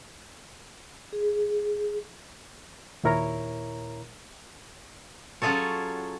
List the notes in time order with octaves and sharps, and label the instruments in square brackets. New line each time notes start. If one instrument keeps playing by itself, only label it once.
[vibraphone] G#4
[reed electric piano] D#2 A#2 E4 A#4 C#5 A#5
[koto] F#3 C#4 F4 G#4 A4 C#5